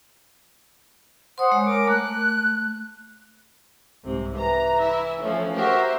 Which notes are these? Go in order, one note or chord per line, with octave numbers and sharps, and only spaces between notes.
C5 F#5 C6 D#6
G#3 C#5
A#4 D6
A3 F#6
C2 G#2 C3
E3 A#5
E4 E5
F3 A3 C#4
F#4 G4 A#4 C5 E5